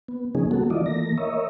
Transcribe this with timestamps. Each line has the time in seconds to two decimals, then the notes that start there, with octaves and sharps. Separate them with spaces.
0.08 B3
0.35 C#3 F3 A#3 C#4 D#4 G#4
0.51 G3 A#3 B3 F#4 A4
0.70 E3 E4 F4 D5 D#5
0.86 E3 A3 A#3 A#6
1.17 A#4 C#5 D#5 E5